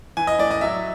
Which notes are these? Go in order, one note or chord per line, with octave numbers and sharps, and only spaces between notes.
E3 G#5
D#5
A2 D5
D#5
F#3 E5